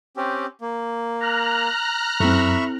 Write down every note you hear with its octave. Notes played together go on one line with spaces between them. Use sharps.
C4 C#4 G4
A#3
A#5 F6 F#6
F#2 C4 E4 A4 E5 B5 C#6